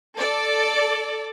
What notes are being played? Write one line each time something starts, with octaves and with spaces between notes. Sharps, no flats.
A4 D5